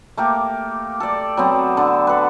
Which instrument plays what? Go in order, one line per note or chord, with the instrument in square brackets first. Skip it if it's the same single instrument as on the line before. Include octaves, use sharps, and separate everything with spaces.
[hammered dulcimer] A3 A#3 G4
A4 D5
F#3 B3 C4
D3
A4 B4